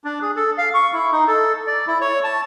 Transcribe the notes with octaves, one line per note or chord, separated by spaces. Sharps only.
D4
G#4
A4
F5
C#6
E4
D#4
A4
D5
E4
C#5
A5